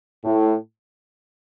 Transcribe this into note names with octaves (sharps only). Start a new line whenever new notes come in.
A2